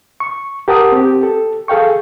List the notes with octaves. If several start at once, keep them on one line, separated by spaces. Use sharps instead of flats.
C#6
G4 A#4 F#5 A5 D#6
C4 G4
A4
G#4 A4 F5 G5 C#6